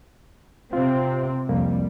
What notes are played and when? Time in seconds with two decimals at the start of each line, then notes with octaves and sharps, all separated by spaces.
0.73 C3 C4 F4
1.49 C2 F2 G3 A#3